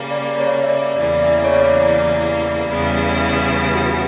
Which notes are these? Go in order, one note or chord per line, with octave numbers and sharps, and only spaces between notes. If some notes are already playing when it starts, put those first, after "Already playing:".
Already playing: C#3 G3 A#3
D5
C#5
E5
D5
E2 C#3 E3 G3 A#3 D5
E5
C#5
D5
E2 C#3 G3 B3 E4
F#4